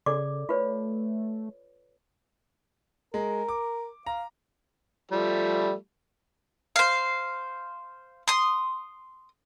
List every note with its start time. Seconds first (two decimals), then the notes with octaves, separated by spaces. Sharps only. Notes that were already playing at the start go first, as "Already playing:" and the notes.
0.06 C#3 A4 D5 D6
0.49 A3 F4 B4 C#5
3.14 G#3 A#4
3.49 D6
4.06 F5 A#5
5.11 F3 G3 A3
6.76 C5 F5
8.28 C6 D#6